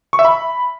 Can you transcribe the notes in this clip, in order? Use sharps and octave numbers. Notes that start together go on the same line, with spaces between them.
C#6
E5
B5